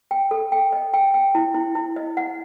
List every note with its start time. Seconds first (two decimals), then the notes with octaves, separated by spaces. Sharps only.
0.11 G5
0.31 A4
0.52 G5
0.73 D#5
0.94 G5
1.14 G5
1.35 E4
1.54 E4
1.75 E4
1.96 D#5
2.17 F#5